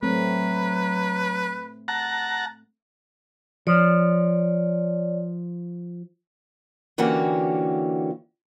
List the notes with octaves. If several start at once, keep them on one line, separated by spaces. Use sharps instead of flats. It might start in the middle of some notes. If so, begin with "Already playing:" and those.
F#3 A3 C4 B4
F#5 A5 A#5
F3 C#5 D5
D3 E3 A#3 C#4 F#4 G4